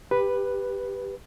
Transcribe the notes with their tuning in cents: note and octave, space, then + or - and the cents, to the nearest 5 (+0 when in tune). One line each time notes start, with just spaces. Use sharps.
G4 +10 B4 +0